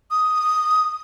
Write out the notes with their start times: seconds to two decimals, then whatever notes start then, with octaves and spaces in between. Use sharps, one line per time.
0.11 D#6